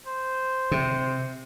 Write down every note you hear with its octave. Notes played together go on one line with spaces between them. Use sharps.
C5
C3